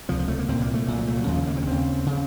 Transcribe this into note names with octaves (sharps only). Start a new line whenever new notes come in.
C#2 C3 F3
F3
A3
A#3
C2 A#2 C4
A#3
A3
C2 A#2 A3
F#3
A3
F#3
D#2 C#3 F3
A3
C4
A#3
C4
C#4
D#2 C#3 C4
C#3